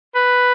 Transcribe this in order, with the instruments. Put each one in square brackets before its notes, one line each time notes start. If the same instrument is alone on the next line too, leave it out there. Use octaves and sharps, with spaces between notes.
[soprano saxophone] B4